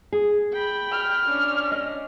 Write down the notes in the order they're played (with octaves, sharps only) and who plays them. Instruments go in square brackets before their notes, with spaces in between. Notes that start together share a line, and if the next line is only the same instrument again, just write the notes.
[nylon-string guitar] G#4
[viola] G5 B5
[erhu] F6
[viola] C#4 D4
[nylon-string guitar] D#5